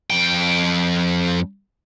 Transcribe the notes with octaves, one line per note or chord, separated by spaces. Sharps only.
F2 G5